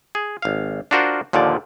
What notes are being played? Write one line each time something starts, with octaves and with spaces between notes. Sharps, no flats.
G#4
G#1 F5
D4 F4 F#4 A#4 C5 D5
D#2 A#2 D3 F3 D5